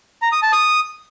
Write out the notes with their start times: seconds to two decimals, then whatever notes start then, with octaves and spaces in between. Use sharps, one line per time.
0.22 A#5
0.32 D#6
0.42 A5
0.53 D#6